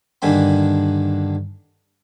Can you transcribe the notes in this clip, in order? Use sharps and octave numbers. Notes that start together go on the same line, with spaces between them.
G2 D3 D#3 A#3 G#5 B5